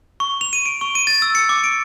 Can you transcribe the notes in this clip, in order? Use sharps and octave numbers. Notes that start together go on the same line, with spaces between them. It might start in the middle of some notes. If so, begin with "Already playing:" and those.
C#6
F7
D#7
D7
C#6
D#7
A6
E6
C#7
D6
D7